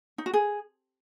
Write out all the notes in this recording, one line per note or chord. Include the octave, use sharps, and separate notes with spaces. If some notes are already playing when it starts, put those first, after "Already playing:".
D#4
F#4
G#4